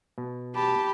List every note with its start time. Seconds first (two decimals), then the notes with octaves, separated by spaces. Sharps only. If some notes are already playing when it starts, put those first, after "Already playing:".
0.18 B2
0.56 G4 A5 B5